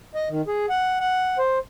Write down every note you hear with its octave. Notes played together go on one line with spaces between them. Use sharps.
D#5
D#3
G#4
F#5
F#5
C5